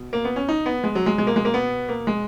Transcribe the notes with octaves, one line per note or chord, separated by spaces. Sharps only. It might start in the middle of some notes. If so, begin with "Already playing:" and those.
Already playing: B2
A#3
B3
C#4
D#4
B3
G#3
F#3
G#3
B2 G#3
A#3
G#3
A#3
B3
A#3
G#3